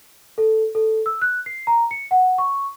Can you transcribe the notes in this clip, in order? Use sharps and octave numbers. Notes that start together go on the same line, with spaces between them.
A4
A4
E6
F#6
C7
A#5
C#7
F#5
C#6